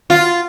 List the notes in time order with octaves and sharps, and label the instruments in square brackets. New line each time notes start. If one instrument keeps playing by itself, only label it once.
[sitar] F4